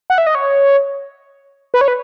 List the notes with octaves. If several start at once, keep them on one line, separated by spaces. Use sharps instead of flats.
F#5
E5
D#5
C#5
B4
C#5
B4